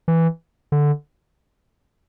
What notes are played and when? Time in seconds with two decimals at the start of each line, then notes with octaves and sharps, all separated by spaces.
0.08 E3
0.72 D3